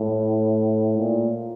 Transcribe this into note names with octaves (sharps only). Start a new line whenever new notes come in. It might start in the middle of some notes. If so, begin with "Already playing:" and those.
Already playing: A2
A#2